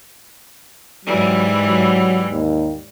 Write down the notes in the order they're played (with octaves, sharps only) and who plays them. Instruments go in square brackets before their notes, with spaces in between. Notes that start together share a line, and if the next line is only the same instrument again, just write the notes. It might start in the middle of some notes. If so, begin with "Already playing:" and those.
[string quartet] G#2 E3 G3 [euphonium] F#3
[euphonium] F#3
D#2